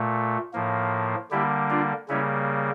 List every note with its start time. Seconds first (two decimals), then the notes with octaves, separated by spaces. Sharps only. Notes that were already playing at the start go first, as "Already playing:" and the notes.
Already playing: A#2 A3
0.53 A2 F3 A#3
1.31 D3 G3 A#3 E4 G4
1.70 D4 F4
2.08 C#3 G3 A#3 C#4 E4